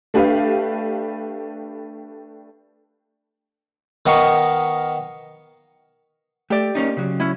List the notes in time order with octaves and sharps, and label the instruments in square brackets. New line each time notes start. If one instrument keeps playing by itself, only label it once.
[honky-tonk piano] A3 D4 G4 B4 F5
[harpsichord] D#3 B3 D#5 F5 A#5 C#6
[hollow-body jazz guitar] A3 [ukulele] G4 D5
[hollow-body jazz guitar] A#3 C#4 D#4
C#3 F#3
[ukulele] C#4 E4